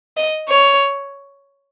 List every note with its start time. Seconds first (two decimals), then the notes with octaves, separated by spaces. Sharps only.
0.17 D#5
0.49 C#5